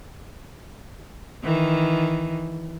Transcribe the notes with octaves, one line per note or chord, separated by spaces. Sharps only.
D#3 E3